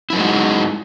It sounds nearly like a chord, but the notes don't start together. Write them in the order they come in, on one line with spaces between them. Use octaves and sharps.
E4 F#3 D#4 G#3 F#4